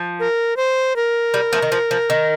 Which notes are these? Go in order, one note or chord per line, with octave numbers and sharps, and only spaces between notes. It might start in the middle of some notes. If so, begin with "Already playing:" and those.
Already playing: F3
A#4
C5
A#4
G3
F3 A3
D#3
F3
F3
D#3